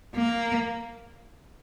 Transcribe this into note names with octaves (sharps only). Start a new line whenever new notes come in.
A#3